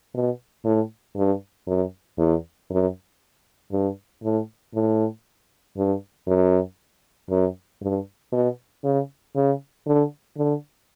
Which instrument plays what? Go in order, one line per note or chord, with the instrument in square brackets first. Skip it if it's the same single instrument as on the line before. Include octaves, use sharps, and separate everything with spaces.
[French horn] B2
A2
G2
F#2
E2
F#2
G2
A2
A2
G2
F#2
F#2
G2
B2
C#3
C#3
D3
D3